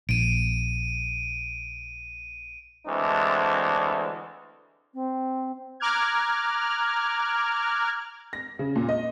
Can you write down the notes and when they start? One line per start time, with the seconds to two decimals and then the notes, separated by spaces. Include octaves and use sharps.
0.09 A#1 D7 D#7
2.86 D2 E3 G#3 C4 D4
4.93 C4
5.80 A#5 D6 F6 F#6 G#6
8.33 A#6
8.59 C#3
8.76 A#2
8.89 D#5